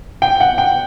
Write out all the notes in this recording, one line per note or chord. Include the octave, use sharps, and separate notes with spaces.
G5
F#5
G5